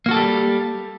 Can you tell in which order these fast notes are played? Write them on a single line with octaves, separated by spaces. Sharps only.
A#3 F#4 A4 G4 G3